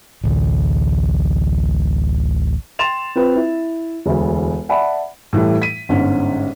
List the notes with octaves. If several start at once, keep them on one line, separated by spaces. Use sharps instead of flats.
A1 D2 D3
G5 C6 A6 E7 F7
C4 F4 B4
E4
E1 D2
D5 E5 F#5 A5 B5
A2 E3 G3 A3
B6 D#7
G1 G#2 C#4